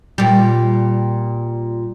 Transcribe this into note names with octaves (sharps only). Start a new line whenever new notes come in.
A#2 G3